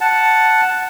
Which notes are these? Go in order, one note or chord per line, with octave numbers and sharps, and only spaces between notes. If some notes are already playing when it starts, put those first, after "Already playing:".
F#5 A5